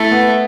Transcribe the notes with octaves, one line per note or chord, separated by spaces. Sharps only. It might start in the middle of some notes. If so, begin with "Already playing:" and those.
Already playing: A3 E4
B3